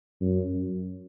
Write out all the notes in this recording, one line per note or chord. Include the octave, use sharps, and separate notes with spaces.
F#2